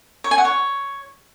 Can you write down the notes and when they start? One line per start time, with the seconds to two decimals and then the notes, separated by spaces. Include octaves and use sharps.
0.24 C#5
0.31 G#5
0.38 F#5
0.45 C#5